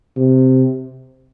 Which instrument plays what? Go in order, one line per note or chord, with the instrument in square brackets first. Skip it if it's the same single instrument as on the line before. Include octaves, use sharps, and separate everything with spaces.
[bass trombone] C3